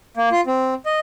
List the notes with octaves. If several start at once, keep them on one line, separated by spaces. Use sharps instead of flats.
A#3
F4
C4
D#5